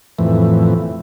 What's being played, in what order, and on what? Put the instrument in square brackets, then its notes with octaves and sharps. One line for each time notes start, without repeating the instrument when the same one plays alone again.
[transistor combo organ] F2 A2 E3